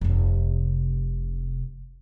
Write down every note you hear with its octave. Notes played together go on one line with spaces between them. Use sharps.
F1 C3